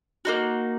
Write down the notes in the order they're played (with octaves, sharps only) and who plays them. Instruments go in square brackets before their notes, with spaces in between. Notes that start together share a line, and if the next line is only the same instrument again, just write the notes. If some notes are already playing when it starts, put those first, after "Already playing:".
[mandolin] A#3 D#4 F#4